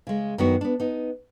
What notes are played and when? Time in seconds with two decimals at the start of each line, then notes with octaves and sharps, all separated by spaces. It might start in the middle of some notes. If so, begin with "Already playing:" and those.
0.07 C#3 G#3
0.38 F#2 D#3 B3 D4 F#4
0.61 B3 D4
0.80 B3 D#4